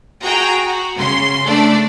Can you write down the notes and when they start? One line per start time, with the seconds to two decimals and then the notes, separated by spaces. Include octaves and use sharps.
0.24 F#4 G#4 G5 A#5
0.65 F#4
0.98 C#3 C6
1.46 A3 D4 D5